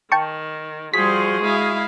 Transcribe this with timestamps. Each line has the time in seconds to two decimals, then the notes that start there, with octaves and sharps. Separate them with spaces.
0.12 D#3 G5 A5 C#6
0.94 F3 G3 F#4 G#4 C5 B6
1.41 G#3 E4 F5